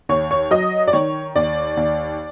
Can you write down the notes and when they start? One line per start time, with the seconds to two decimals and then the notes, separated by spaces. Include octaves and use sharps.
0.09 D#2 C#5
0.31 C#5
0.51 F#3 D#5
0.88 D5
0.93 D#3 C#5
1.36 D#2 D5
1.77 D#2